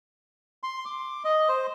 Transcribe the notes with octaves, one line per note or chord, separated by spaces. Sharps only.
C6
D6
D#5
C5